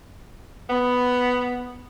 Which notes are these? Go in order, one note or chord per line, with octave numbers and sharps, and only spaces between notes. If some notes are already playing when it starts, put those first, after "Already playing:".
B3